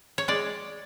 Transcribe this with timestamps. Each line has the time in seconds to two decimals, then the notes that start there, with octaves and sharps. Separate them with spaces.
0.18 C#5
0.28 G#3 D5